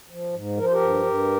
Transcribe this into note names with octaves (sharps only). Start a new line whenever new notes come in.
F3
G#2
F3 A#4
C5
G4 A#4
G2
G2